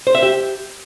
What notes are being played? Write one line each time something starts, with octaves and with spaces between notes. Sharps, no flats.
C5
E5
G4